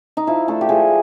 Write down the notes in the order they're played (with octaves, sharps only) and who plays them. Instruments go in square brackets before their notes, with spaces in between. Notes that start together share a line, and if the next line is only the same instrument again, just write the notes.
[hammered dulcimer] D#4
F3 E4
A3 D4 A4
G4
F3 G#4